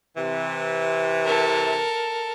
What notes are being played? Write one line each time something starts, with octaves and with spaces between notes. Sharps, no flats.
C3 E3
A4 A#4